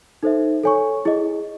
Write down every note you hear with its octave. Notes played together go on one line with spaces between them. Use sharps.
D#4 A4 C5 E5
A4 C#5 G#5 C#6
E4 G#4 D#5